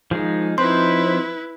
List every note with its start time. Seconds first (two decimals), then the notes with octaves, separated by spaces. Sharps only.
0.11 D#3 F3 G#3 D#4 G#4
0.58 F3 C4 D#4 E4 B4 C5 C6